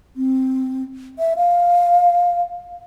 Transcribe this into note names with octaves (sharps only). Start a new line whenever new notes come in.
C4
E5
F5